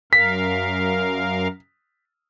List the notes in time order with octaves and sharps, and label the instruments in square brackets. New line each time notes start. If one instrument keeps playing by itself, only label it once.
[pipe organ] F#2 A#4 F5 [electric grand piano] B6